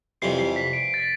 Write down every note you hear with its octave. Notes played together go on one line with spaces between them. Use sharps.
F2 C3 E3 G3 C7
C7
B6
D7
A6
B6